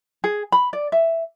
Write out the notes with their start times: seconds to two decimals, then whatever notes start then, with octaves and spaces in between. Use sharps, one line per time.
0.24 G#4
0.52 B5
0.73 D5
0.92 E5